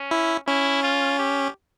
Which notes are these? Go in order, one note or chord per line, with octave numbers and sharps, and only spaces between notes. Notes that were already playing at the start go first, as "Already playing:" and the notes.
Already playing: C#4
E4
C#4 E4
F4
G4